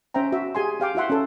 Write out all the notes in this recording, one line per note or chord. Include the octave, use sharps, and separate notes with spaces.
C#4 C5 E5 G5 A#5
F#4 E5
G4 G#4 G#5 C6
G4 F5 G5 D6
E4 F#4 E5 F#5 C6
C#4 A4